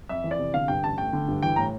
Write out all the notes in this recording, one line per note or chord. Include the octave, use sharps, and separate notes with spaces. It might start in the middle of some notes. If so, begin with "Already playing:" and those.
F2 E5
E3
D5
C3
D3 F5
G2 G5
A1 A5
A3 G5
D3
G2
E3 G5
A2 A#5